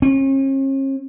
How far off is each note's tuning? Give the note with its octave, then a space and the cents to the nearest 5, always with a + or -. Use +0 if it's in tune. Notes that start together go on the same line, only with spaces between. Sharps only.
C#4 -45